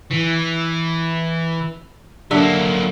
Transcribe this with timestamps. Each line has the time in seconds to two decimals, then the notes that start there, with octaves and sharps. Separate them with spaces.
0.11 E3
2.31 D3 F#3 A#3 E5